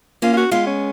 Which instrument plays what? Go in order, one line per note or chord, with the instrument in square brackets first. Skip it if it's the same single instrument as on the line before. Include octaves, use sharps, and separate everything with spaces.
[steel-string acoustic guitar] A#3 C#4 [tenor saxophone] F4
[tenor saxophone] F4
F#4
[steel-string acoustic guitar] G#3 B3 [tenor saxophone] F4
[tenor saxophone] C#4